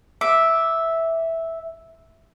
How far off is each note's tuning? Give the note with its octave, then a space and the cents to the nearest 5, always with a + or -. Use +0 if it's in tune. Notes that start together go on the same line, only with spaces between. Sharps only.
E5 -5 D6 +0